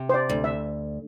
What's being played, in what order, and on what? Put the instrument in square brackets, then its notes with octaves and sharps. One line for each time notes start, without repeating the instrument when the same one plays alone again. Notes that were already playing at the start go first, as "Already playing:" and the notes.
Already playing: [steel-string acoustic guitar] C3
[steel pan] C5
D5
[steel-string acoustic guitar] D2
[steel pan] E5